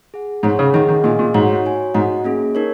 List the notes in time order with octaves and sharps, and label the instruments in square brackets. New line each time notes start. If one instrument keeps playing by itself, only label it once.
[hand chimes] G#4 F#5
[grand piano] G#2 [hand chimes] G#4 C#5 F#5
[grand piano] C#3
[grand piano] D#3 [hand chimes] G#4 D#5 F#5
[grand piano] D#3
[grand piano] A#2 [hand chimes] G#4 D#5 G#5
[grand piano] A#2
[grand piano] G#2 [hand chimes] F#4 C#5 F#5
[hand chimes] F#4 C#5 G#5
[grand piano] G#2 [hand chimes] F#4 D#5 F#5
[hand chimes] A#3 C#4 G#4
D#4 A#4 C#5